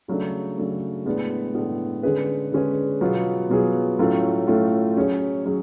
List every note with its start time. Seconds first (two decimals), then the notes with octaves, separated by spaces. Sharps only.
0.08 C#3 F#3 A3 D4
0.57 C#3 F#3 A3 D4
1.05 A2 G#3 B3 D4
1.55 A2 G#3 B3 D4
2.03 D3 G#3 C#4 G#4 B4
2.52 D3 G#3 C#4 G#4 B4
3.01 B2 F#3 B3 F4 G#4
3.49 B2 F#3 B3 F4 G#4
3.99 A2 F#3 A3 C#4 F4
4.47 A2 F#3 A3 C#4 F4
4.97 F#3 C#4 G#4 C#5
5.45 F#3 C#4 G#4